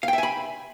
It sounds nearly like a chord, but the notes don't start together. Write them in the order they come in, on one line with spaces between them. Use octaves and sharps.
F5 G5 E5 G#5 B5